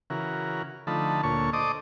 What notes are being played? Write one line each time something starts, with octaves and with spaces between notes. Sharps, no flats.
C#3 E3 F#4 A#4
D3 F3 A3 D#4 A5 B5
D2 A#2 A4 C#5 C#6
A4 C5 D5 D#5 D6 D#6